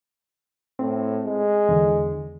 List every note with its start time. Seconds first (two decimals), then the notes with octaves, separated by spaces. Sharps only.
0.79 A2 C4
1.24 G#3
1.69 E2 D3